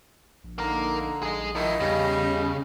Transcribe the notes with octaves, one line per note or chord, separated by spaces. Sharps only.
A#1
D3 A#3 D#4 A#4
A#1 G#4 D#5
D#3 F3 E4 D#5
E2 C#3 G3